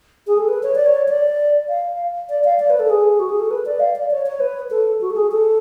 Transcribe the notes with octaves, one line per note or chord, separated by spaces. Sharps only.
G#4
A4
B4
C#5
D5
C#5
D5
F5
D5
F5
D5
B4
A4
G#4
F#4
G#4
A4
B4
D5
F5
D5
C#5
C#5
B4
A4
F#4
A4
G#4
A4